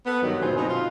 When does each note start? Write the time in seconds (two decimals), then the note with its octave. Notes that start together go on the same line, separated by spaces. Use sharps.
0.06 B3 A4
0.22 G2 D#3 F#3
0.41 D2 A#2 F4 G#4 C5
0.57 B2 C4 D#4
0.69 F4